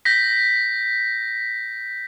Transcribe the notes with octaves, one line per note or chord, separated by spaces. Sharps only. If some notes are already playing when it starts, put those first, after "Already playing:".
G6 A#6 B6